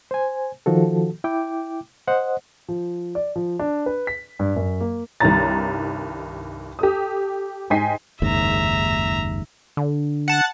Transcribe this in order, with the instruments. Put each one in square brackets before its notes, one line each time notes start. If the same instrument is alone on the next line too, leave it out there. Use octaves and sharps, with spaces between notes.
[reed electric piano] C5 G#5
D#3 F3 F#4 A4
E4 G5 D6
C5 D#5 F#5
[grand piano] F3
D5
F3
D4
B4
B6
G2
F#2
A#3
[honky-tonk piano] C2 G2 D#3 C#5 A#5 A6
G4 A4 D#6
G#2 D#4 G5 G#5 B6 C7
[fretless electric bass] F#1 D#2 G#2 [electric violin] E5 A#5
[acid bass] D3
[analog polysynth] F#5 A5